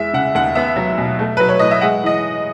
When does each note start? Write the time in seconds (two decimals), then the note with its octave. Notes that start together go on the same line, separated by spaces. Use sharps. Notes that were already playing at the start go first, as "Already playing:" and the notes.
Already playing: E2 G#3 E5
0.13 C#3 F#5
0.35 D#2 F#5
0.55 B3 E5
0.76 F#3
0.98 B2
1.19 A3
1.37 F#3 B4
1.49 C#5
1.59 A2 D#5
1.71 E5
1.81 G#3 F#5
2.03 E3 D#5